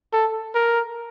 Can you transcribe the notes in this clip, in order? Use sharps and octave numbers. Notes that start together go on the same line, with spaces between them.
A4
A#4